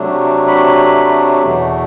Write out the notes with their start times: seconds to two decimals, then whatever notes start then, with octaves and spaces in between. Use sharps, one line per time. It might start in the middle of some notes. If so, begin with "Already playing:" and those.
Already playing: C3 F#3 A3 D4
0.47 B5
1.42 E2 B2 A3